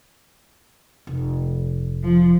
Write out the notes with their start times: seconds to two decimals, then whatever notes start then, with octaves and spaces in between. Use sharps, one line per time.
1.07 F1
2.03 F3